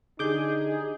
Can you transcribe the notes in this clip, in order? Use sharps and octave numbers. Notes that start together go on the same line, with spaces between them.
D3 D4 D#4 G4 G#4 D6 G6